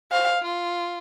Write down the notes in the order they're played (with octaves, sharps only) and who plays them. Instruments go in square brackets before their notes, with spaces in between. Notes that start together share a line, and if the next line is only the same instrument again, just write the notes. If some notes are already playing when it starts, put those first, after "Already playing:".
[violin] C5 [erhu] F5
[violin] F4